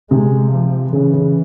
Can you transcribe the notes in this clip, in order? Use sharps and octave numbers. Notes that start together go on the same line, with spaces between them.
C3 G#3
F3
C#3 E3
C#3